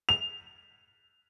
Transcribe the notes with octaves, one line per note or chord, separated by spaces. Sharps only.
F7